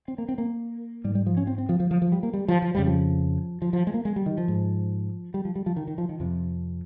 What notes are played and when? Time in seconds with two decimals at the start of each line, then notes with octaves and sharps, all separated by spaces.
0.08 C4
0.18 A#3
0.29 C4
0.38 A#3
1.04 G#2 G3
1.15 G3
1.26 F3
1.37 C#4
1.47 C4
1.58 C4
1.69 F3
1.80 F3
1.91 F3
2.02 F3
2.12 G3
2.23 A#3
2.34 G3
2.48 F3
2.62 F3
2.75 F2 C#3 G3
2.86 F3
3.62 F3
3.73 F3
3.87 G#3
3.94 A#3
4.05 G#3
4.16 G3
4.26 D#3
4.38 F3
4.48 G#2
5.34 G3
5.45 F3
5.56 G3
5.66 F3
5.76 D#3
5.88 D#3
5.98 F3
6.09 D#3
6.20 F2 C3 F3